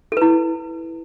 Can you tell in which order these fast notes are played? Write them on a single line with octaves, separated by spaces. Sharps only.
A4 B4 E4